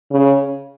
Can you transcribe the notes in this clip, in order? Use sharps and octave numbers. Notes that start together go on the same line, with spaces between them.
C#3